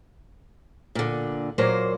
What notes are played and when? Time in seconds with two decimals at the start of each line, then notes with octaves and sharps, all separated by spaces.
0.95 A#2 D3
1.58 A#2 F#3 A#3 C5